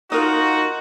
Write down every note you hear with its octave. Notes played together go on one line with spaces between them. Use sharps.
D#4 F4 F#4 A#4 D#5